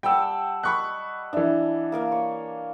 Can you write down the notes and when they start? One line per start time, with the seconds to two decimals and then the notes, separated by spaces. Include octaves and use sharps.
0.03 G3 F#5 G5 A5 E6
0.63 D#5 B5 C#6 F#6
1.33 E3 D4 E5
1.92 A#3 A#4 F5
2.12 C#5